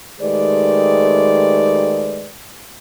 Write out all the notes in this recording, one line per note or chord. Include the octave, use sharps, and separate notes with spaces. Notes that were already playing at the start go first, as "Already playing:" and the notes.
D#3 G#3 A3 G4 B4 D5